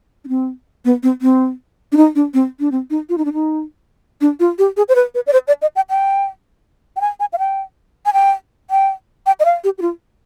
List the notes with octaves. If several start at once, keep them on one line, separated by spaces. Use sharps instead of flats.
D4
C4
B3
C4
C4
D4
D#4
D4
C4
D4
C4
D#4
F4
D#4
D4
D#4
D4
F4
G4
G#4
C5
B4
B4
D5
C5
D5
D#5
G5
G5
G5
G#5
G#5
F5
G5
G#5
G5
G5
G5
D#5
F5
G4
G4
F4